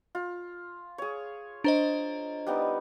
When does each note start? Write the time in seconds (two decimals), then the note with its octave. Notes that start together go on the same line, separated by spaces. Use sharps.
0.15 F4
0.98 G#4 C#5
1.64 D4 C5 D#5 A#5
2.47 G3 B3 D#4